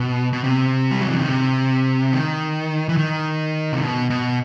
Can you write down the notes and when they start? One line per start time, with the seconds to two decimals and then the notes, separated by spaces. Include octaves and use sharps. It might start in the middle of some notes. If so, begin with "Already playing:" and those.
Already playing: B2
0.33 B2
0.44 C3
0.91 G3
1.01 F#3
1.10 E3
1.18 D#3
1.29 C3
2.13 D#3
2.89 E3
2.97 D#3
3.73 C3
3.82 B2
4.10 B2